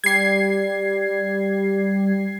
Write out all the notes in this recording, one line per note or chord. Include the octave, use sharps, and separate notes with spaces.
G3 G#6 C7